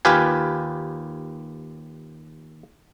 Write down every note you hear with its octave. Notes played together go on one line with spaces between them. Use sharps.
D#2 F4 G4 B4 G#5